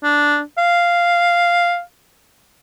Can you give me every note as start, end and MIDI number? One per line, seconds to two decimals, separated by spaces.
0.03 0.41 62
0.58 1.81 77